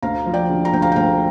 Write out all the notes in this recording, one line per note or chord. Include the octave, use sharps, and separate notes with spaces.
D2 F5 A#5
F3
D5 G5
D3
A#5
D2 G5
F5 A#5
G5
D2 F5 A#5